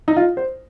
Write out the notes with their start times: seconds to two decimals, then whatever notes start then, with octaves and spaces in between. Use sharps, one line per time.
0.08 D#4
0.17 F4
0.37 C5